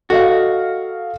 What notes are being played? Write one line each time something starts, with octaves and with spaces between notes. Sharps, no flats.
F#4 A4 D#5 F5